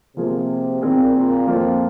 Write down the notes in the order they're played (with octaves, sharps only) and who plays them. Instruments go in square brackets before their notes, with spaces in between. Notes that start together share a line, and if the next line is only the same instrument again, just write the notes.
[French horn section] C3 [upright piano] F3 A#3 F4 G#4
[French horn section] A#2 [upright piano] D#3 C4 D#4 G#4
[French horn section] A#2
[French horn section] F2 [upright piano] F3 A#3 F4